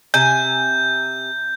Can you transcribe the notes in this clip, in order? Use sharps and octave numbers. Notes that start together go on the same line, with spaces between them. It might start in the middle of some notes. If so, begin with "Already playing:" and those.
C3 G#5 G6